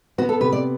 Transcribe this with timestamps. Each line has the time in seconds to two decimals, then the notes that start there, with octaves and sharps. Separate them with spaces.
0.18 B3 F#4
0.29 A4
0.40 C3 B4
0.52 D5